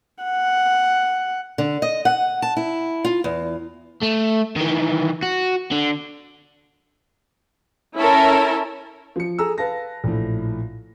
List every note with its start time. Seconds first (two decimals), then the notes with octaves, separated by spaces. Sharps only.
0.23 F#5
1.58 D3
1.82 D#5
2.05 F#5
2.42 A5
2.57 E4
3.04 F4
3.24 E2
4.02 A3
4.56 D#3 E3
5.23 F#4
5.72 D3
7.96 C#4 E4 A4 A#4
9.16 F3 C#7
9.39 G#4 A4 A#5 E6
9.58 B4 F5 A5 A#6
10.04 A#1 A2